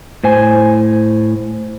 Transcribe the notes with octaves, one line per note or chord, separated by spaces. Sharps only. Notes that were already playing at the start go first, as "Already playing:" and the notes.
A2 C5 G#5